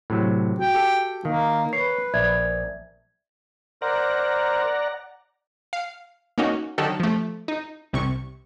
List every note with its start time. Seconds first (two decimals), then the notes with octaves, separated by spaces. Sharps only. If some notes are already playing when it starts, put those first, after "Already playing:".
0.10 A2 C3 F#3
0.59 F#4 G5
0.75 G4 A4
1.25 D#3 A#3 F5
1.73 B4 C#5 C7
2.14 A#1 D5 E5 G#6
3.82 A#4 C5 D5 F#5 A#5
5.73 F5
6.38 A#3 C#4 D#4 F#4
6.78 D3 D#3 F#3 D#4 G4 A4
7.00 F3 A3
7.48 D#4
7.93 C2 C3 C#6